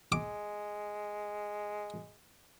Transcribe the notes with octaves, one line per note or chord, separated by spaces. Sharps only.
G#3 D6